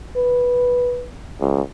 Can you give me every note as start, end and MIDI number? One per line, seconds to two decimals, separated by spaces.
0.16 1.06 71
1.40 1.61 37